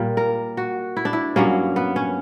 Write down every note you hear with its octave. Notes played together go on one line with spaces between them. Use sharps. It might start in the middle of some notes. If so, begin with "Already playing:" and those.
Already playing: A#2 G3 A#3
A#4
F#4
E4
D4
E4
G2 F#3 A#3 C#4
B3
C#4